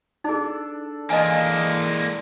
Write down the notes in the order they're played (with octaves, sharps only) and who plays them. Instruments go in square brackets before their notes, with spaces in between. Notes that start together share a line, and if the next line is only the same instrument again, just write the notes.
[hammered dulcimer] D4 A4 [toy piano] D#4 G#4
[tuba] E3 [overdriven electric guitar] G#3 A#3 [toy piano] D#5 F5 G#5